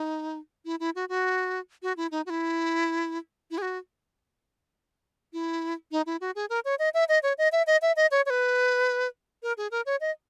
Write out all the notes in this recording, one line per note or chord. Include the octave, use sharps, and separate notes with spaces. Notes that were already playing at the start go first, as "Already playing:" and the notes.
Already playing: D#4
E4
E4
F#4
F#4
F#4
E4
D#4
F#4
E4
E4
G#4
F#4
E4
D#4
E4
F#4
G#4
A#4
C#5
D#5
E5
D#5
C#5
D#5
E5
D#5
E5
D#5
C#5
C#5
B4
A#4
G#4
A#4
C#5
D#5